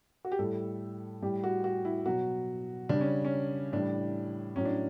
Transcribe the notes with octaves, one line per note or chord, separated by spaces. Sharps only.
F#4
G4
A2 G3 A4
A2 G3 G4
F#4
F#4
E4
B2 F#3 F#4
C#3 G3 D4
C#4
C#4
A2 E3 G3 D4
A2 F#3 C#4
D4